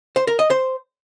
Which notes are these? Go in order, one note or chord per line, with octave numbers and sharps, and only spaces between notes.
C5
A#4
D#5
C5